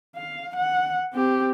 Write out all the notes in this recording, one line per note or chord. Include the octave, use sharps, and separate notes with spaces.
F5
F#5
C4 G4